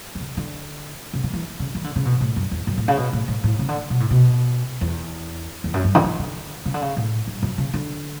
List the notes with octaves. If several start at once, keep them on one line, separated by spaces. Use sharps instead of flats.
E3
D3
D3
C#3
D3
E3
C#3
E3
D3
C#3
B2
A2
F#2
E2
F#2
A2
C#3
B2
A2
A2
A2
C#3
D3
B2
A2
B2
E2
E2
F#2
G2
D3
E3
D3
C#3
D3
C#3
A2
G2
F#2
C#3
D3